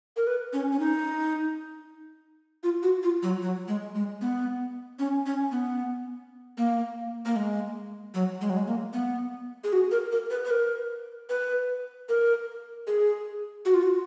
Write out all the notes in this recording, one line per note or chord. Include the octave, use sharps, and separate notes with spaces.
A#4
B4
C#4
C#4
D#4
F4
F#4
F4
F#3
F#3
G#3
G#3
B3
C#4
C#4
B3
A#3
A#3
G#3
F#3
G#3
F#3
G#3
A#3
B3
G#4
F#4
A#4
A#4
B4
B4
A#4
B4
A#4
G#4
F#4
F4
F#4